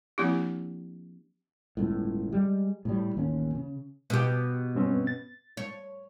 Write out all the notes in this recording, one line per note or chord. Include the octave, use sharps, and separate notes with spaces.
F3 A#3 C4 D4 E4 G4
G1 C#2 A2
G3 G#3
A2 G3
A1 D#2 C#4
C#3
B2 G4
G2 C4 C#4
A6
C#5